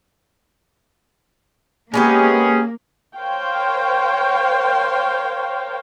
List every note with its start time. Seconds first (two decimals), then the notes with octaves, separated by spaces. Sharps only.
1.94 G#3 A#3 B3 C#4 G4 G#4
3.17 A#4 C5 C#5 F5 G5